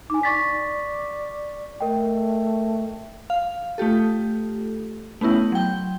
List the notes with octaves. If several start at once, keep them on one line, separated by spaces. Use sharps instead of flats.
D#4 G#5 D6
D5 C#6 A6 B6
A3 A#4 D#5 G5
F5
A3 F4 G4 A4
A3 B3 C#4 E4
F#3 G5